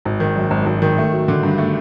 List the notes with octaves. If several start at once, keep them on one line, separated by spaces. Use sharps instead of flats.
G#1
D#3
F#2
G#1
G#1
D#3
A3
F#3
D3
G2
A3